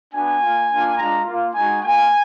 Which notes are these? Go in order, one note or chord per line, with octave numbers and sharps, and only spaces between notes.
B3 D4 F#4 G#5
A#3 F4
A#3 D4 F4
G#3 D4 F4 A#5
A#3 F4
G#3 D#4 F#4 G#5
A#3 F4 G#5